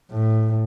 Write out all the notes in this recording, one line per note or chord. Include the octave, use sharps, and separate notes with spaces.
A2